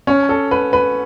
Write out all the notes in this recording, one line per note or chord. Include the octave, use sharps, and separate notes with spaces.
C#4
A4
B4
B4